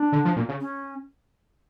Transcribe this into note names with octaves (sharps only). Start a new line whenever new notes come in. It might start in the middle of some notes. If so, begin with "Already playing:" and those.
Already playing: D4
D3
F3
A#2
C#3
C#4